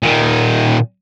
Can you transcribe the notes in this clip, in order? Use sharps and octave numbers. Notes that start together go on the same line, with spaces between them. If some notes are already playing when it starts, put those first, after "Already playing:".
A#2 D#3